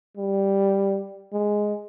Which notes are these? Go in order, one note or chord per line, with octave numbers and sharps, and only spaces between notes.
G3
G#3